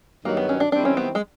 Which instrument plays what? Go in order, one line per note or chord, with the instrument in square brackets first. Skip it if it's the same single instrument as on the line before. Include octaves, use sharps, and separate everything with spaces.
[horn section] G2 D#3 F#3 [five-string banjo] A#3
[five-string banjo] B3
C#4
D4
[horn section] F#2 D#3 G3 C4 E4 [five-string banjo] D4
[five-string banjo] C#4
B3
G#3